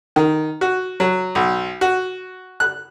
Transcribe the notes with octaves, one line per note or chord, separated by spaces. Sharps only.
D#3
F#4
F#3
B1
F#4
F#6